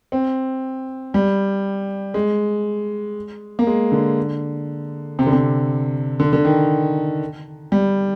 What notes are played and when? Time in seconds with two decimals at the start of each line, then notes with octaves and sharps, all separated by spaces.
0.12 C4
1.14 G3
2.14 G#3
3.59 A#3
3.67 G#3
3.92 D3
5.19 C3
5.26 D3
5.32 C3
6.20 D3
6.33 D3
6.45 D#3
7.72 G3